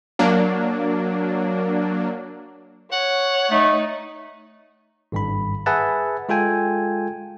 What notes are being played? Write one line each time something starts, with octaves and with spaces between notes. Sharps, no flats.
F#3 A#3 D4
C#5 F#5
A3 D#4
G#1 G2 B5
G#4 B4 E5 F#5 G#5 A5
G#3 F4 A4 G5 G#5